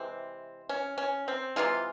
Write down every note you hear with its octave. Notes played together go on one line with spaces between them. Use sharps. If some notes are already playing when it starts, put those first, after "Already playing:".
Already playing: C3 E3 G#3 C4
C#4
C#4
C4
C3 E3 G#3 F4